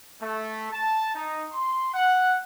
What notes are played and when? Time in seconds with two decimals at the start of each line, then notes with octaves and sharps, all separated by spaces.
0.20 A3
0.72 A5
1.14 D#4
1.52 C6
1.94 F#5